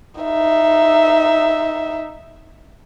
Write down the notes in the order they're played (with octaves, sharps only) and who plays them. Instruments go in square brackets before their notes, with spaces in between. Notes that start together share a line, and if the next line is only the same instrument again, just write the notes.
[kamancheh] D#4 E5